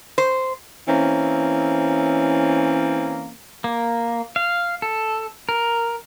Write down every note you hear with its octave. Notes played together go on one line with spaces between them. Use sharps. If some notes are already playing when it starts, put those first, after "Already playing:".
C5
E3 A#3 C4 C#4
A#3
F5
A4
A#4